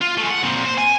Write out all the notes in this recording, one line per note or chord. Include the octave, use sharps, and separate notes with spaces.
F4
G#3 A3
F#5
A#2 C4
C5
G#5